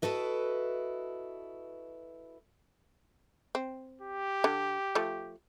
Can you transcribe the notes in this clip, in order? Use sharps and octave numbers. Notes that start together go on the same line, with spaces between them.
E4 F#4 A4 B4 D#5
C4
G4
D3
F3 A3